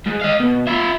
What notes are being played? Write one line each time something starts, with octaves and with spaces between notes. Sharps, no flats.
G#2
D#5 F5
B2
F4 E5